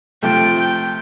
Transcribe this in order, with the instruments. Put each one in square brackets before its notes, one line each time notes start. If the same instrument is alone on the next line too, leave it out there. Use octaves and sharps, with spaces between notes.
[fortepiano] C3 F3 A3 [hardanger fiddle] G5
[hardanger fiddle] G5